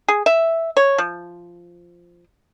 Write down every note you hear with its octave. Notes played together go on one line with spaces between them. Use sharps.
G#4
E5
C#5
F3